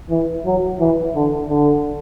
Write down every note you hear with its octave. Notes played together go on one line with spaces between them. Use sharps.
E3
F#3
E3
D3
D3